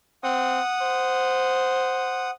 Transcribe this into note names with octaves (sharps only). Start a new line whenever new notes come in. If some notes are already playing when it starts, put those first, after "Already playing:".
C4 F#5 D#6
C5